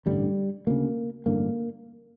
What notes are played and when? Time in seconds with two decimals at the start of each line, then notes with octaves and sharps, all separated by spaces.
0.06 A1 G2 D3 G3
0.67 D2 C#3 A#3
1.26 A1 G2 D3 A#3